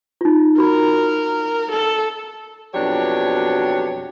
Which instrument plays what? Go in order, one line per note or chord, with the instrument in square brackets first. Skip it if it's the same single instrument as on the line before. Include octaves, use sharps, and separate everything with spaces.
[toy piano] D#4 F4
[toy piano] F#4 B5 [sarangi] A#4
[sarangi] A4
[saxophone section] F2 B2 F#3 D4 G4 C#5